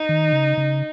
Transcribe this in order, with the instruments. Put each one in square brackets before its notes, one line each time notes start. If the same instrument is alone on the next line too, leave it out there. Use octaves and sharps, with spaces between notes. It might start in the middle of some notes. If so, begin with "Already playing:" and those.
Already playing: [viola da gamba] D#4
[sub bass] D#3
C#3
C#3